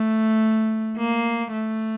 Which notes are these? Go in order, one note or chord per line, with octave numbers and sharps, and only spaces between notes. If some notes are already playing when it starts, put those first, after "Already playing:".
Already playing: A3
A#3
A3